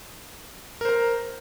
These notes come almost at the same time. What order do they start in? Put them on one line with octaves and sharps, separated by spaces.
A#4 C5 A#5